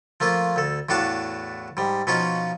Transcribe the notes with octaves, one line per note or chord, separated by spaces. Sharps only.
F3 A3 A#3 F4
D2 A4
E2 A2 D4 F#4 F5 A5
G#2 G3
B2 F3 C#4 D#4 F4